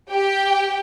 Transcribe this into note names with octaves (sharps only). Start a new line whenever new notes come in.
G4 G5